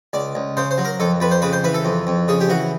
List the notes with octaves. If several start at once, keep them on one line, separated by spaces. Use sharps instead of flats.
C#2 D5
C#2
C#3 C5
C5
F#3
A#4
F2 A4
F2 B4
C5
C#3 B4
C5
E3 B4
A4
F2
F2
C#3 G#4
G4
E3 F#4